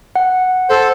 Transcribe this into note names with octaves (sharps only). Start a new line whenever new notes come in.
F#5
A4 C5